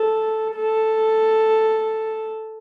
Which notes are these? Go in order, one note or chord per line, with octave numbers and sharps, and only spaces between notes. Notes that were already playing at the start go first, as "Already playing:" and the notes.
Already playing: A4
A4